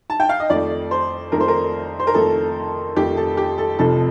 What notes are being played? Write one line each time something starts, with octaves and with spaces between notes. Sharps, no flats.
A5
G5
F5
D#5
F2 D#3 A3 D5
C5
F2 D#3 A3 A#4
C5
A#4
C5
A#4
F2 D#3 A3 A4
F2 D#3 A3 G4
A4
G4
A4
F1 F2 C3 F3 A4